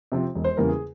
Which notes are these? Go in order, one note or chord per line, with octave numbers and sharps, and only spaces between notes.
C3 F3 C4
E1
C5
E2 C#3 G3 A#3 A#4
G#4